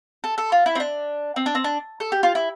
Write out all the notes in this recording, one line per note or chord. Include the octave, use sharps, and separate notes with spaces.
A4
A4
F4
E4
C4
D4
C4
D4
C4
D4
A4
G4
F4
E4